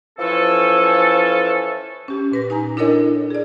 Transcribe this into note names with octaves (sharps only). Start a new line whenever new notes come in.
E3 F3 C#4 A4
C#4 G4
A#2 B4 A#6
D#4 G#5 A#5
D4 E4 A4 A#4 C#5 D#5
G#4 D5